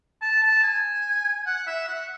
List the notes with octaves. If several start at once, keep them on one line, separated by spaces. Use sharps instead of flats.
A5
A5
G#5
F#5
E5
F#5